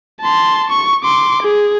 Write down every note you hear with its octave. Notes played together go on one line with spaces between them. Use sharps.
A5 C6
C#6
C6 D6
G#4